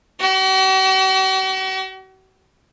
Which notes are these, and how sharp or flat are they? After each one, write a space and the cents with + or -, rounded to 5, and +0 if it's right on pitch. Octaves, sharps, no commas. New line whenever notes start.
F#4 +45